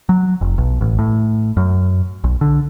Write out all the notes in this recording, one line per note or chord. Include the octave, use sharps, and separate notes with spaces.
F#3
F1
B1
A1
A2
F#2
B1
D3